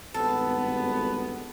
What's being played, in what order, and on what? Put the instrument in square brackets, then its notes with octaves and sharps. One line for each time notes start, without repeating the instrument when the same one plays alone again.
[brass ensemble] G#1 G2 B3 [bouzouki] A4